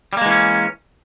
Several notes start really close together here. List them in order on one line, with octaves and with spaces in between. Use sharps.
G3 A#3 G#3 E3 C#4